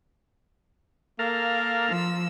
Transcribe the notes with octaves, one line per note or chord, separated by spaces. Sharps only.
A#3 A4 A#4 F5
F3 E6